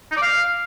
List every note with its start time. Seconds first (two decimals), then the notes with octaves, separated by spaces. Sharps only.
0.11 D#4
0.17 D5
0.22 F5